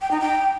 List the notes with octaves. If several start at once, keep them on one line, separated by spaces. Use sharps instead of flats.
G5
D#4
G5